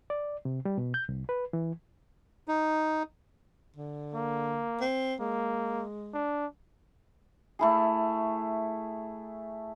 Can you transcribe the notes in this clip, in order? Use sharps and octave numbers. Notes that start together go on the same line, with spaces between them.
D5
C3
G3
B2
G6
C2
B4
E3
D#4
D3
A#3
C4
G#3 A#3
D4
A3 E4 G#4